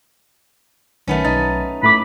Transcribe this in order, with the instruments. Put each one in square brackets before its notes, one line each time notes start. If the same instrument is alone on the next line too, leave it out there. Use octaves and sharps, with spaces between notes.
[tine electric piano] B1 D#3 [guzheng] A3 B3 C#4
[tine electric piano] B1 A6 [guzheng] D#4
[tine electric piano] A2 A3 D6 [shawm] B5